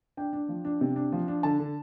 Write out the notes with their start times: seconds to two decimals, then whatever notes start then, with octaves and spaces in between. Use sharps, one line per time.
0.17 D4 G5
0.33 D4
0.49 F3
0.65 D4
0.81 C3
0.96 D4
1.12 F3
1.28 D4
1.43 D3 A5
1.60 D3